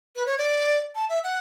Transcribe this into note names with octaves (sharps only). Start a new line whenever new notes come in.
B4
C#5
D5
A5
E5
F#5